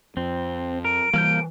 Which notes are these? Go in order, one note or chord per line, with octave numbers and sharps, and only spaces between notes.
F2 C4
A#4 D7
E3 G3 A#3 F6 G6